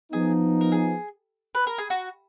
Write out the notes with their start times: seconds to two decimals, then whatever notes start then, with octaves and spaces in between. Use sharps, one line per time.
0.12 F3 B3 D#4 G#4
0.61 A#4
0.72 G#4
1.55 B4
1.67 A#4
1.78 G#4
1.90 F#4